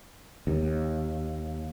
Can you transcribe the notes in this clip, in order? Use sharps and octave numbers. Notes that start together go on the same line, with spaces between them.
D#2